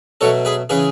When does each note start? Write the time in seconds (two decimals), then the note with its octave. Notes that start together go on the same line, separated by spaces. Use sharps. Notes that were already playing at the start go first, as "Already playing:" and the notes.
0.21 B2 F#3 A3 A4 C#5
0.45 G#4 B4
0.70 C#3 E3 G#4 B4